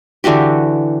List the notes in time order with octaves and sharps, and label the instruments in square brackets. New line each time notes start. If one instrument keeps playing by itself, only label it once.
[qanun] D3 E3 F#4 G4